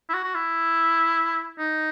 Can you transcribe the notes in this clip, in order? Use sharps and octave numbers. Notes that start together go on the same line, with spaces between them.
E4
F#4
F#4
E4
D#4